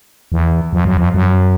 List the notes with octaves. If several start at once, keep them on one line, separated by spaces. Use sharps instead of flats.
E2
F2
F#2
F2
F#2